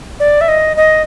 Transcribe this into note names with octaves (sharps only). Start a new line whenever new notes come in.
D5
E5
D#5
D#5